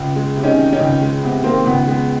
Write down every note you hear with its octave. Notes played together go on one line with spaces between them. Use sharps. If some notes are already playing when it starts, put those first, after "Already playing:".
Already playing: C#2
G#3
C3
C#4 D#4
D#3
C#4 D#4
C#2
G#3
C3 B3
D#3 A#3 C4
C#2 B3
G#3 B3